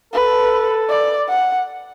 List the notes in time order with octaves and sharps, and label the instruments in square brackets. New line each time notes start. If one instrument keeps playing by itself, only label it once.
[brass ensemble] A4 [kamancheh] B4
[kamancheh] D5
F#5